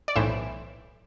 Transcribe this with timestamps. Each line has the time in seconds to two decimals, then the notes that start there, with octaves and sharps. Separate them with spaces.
0.08 D5
0.16 B1 A2 E3 C5 E5